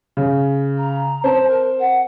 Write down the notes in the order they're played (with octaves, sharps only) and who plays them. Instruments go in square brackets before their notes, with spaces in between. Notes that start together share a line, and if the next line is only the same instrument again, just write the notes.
[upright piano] C#3
[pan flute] A#5
[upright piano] C4 C5 [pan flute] A5
[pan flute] A#4
F#5